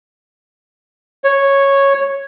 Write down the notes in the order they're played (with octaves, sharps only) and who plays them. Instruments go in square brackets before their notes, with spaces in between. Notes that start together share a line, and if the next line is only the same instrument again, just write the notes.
[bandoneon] C#5